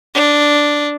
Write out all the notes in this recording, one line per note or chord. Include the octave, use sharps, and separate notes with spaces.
D4